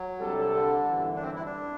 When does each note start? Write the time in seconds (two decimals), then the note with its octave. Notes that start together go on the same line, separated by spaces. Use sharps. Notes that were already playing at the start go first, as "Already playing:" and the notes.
Already playing: F#3
0.20 C2 C3 G3 D4 A4
0.55 D3
0.89 G1 F#2 E3
1.16 D4
1.23 C4
1.35 E4
1.46 D4